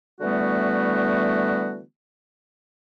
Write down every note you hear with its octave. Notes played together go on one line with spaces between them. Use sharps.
D3 E3 G3 A3 B3 F#4